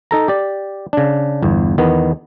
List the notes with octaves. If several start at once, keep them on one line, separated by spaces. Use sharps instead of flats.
D#4 A4 A#5
G4 D5
C#3 D4
G1 E2
E2 D#3 B3